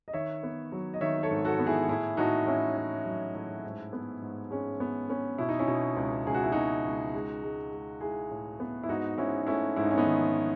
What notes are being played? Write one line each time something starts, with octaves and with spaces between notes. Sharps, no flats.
D#5
D#3 C#5 E5
B3
F#3
D#5
D#3 C#5 E5
A4 C#5
G#2
F#4 A4
B3
E4 G#4
A2 E4 G#4
A2 D#4 F#4
A2 C#4 E4
A2
F#3
A2
G#2
B3
G#2
G#3 C#4
B3
B3 C#4
B2 E4
D#4
C#4 E4
B2
C#2
C#2 G#4
F#4
E4
B2 D#4 F#4
C#2
G#3
G#3
G#3
G#3 E4 G#4
A2
B3
E4
G#2 D#4 F#4
G#2 C#4 E4
A3 C#4 E4
G#2 E4
D#4
C#4
B3 D#4
D#3